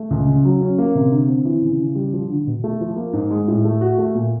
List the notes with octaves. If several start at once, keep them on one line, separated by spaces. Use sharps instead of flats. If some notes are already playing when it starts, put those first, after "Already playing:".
Already playing: A3
C#2
C#3
F#3
C#4
A#3
C3
D3
C4
E3
C#3
C#3
G3
F3
D3
B2
A3
F3
A#3
G#2
G#3
A2
A3
F#4
A3
A#2